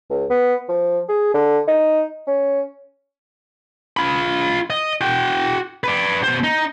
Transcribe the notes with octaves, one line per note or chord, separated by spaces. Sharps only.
C#2
B3
F3
G#4
D3
D#4
C#4
F4 B5
D#5
F#4 G5
B4 D5
B2 C5
D#4